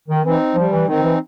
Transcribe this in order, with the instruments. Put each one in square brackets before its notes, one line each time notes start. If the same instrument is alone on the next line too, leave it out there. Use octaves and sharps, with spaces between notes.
[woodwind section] D#3
[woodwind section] E3 [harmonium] C4 D#4
[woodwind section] F3 [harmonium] G3
[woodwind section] E3
[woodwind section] D#3 [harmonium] C4 D#4
[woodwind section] E3